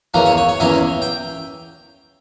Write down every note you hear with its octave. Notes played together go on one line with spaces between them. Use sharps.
E2 E3 A#3 C#4 A#4
C#5
C#5
C#5
E2 E3 A#3 C#4 E5
G5